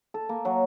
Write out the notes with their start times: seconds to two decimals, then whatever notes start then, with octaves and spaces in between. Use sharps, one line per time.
0.14 A4
0.29 A#3
0.45 F#3